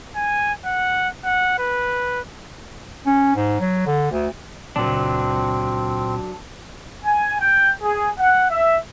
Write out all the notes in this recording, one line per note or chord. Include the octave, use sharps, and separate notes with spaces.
G#5
F#5
F#5
B4
C#4
G#2
F#3
D3
D2
D#1 C#2 A#2 F#3 C4 D4
G#5
G5
G#4
F#5
E5